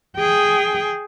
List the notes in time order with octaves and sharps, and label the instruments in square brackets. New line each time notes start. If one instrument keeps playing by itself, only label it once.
[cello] G#4 G5